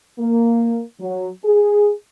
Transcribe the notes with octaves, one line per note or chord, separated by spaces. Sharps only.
A#3
F#3
G#4